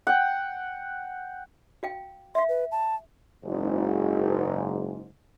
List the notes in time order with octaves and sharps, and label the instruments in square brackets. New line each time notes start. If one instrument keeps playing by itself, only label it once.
[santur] F#5 G5
[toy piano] F#4 F5 G5
[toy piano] E5 F5 [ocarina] C6
[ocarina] B4
A5
[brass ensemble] F#1 G#2